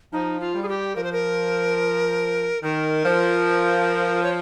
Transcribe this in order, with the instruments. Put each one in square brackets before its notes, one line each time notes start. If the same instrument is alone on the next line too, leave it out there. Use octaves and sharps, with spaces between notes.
[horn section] F3 [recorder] D#4
[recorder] F4
[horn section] G3
[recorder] G#4
G4
[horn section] F3 [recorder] A#4
[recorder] C5
A#4
[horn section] D#3 [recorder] A#4
[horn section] F3
[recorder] C#5